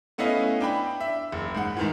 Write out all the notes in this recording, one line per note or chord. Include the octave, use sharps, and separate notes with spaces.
A3 B3 C#4 E4 D#5 F5
D4 G5 B5
E5
F#1
G#2 F#5
G#2 D#3 E3